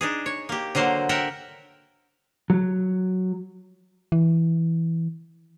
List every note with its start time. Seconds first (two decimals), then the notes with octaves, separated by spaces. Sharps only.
0.01 D4 D#4 G#4
0.26 C#5
0.49 A#3 G4
0.75 D3 F#3 A#3 C5
1.09 A#4 E5 F#5 G5
2.50 F#3
4.12 E3